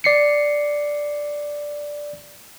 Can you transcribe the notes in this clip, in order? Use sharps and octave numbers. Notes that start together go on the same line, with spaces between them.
D5 C7 C#7